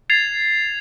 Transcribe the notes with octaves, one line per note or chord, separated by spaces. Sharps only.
G#6 A6 C7 F7